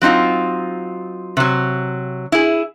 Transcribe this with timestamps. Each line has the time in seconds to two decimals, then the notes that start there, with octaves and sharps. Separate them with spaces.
0.02 F#3 C4 D#4 F4
1.37 C3 F#3
2.32 E4 G#4